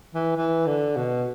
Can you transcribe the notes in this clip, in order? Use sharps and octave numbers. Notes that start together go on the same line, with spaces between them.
E3
E3
D3
B2